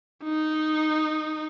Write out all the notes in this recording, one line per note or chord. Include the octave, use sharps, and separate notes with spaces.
D#4